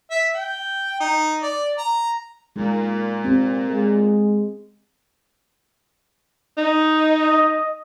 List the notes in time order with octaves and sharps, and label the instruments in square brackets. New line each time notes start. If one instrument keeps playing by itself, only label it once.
[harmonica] E5
G5
D#4
D5
A#5
[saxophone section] A#2 [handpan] G#3 D#4
[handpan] C4 G4
[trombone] G#3
[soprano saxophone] D#4
[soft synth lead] D#5